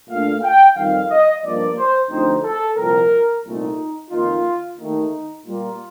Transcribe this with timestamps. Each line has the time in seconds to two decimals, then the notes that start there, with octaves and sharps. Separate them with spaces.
0.09 A#2 A3 D4 F5
0.43 G5
0.76 F2 D#3 G3 F5
1.10 D#5
1.43 G2 F3 A#3 D4 D5
1.77 C5
2.10 D2 D3 F3 C4 D#4 C5
2.44 A4
2.77 C2 A#2 F3 C4 A#4
3.43 C2 A#2 A3 D#4
4.11 F2 D#3 A#3 D#4 F4
4.77 D#2 D#3 A3 D#4
5.45 A#2 G3 A#3 F4